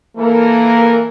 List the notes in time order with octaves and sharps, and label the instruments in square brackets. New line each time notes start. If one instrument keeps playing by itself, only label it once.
[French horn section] E3 A4 A#4 [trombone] A#3